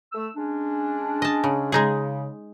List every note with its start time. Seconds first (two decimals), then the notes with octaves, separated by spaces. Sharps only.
0.13 A3 E6
0.36 G#3 C#4 D4
1.22 D#5 A5
1.44 C#3
1.72 C#3 G#3 D#4 G#4